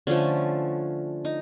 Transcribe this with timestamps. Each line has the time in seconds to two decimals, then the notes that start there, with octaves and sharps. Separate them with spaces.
0.07 D3 F3 A3 C#4
1.25 D#4